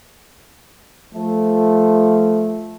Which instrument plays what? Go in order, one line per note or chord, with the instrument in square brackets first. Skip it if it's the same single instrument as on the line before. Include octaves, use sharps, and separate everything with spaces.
[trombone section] F3 A3